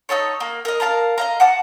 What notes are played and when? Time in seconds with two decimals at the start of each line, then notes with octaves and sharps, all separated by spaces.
0.09 D#4 E4 A4 C#5
0.40 A#3
0.65 A#4 D#5
0.80 A#4 F5 A5 A#5
1.18 D#5 F5 A#5
1.40 F#5 A5 D6